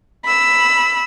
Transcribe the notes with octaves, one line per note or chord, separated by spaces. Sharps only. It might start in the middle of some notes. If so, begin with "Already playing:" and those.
B5 E6